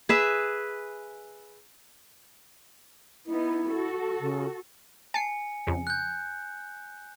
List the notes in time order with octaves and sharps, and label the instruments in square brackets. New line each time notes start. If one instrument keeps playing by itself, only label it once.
[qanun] G#4 B4 E5
[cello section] B3 D#4 [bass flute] E4
[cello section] F#4 A4
[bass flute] C#3
[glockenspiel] G#5 C#7 [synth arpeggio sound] A5 C7
[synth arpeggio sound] F2 C#3
[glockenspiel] F#6 G6